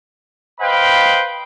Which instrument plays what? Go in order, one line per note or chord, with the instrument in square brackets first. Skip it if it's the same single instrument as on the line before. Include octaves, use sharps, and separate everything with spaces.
[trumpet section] B4 C5 D#5 F5 G5 B5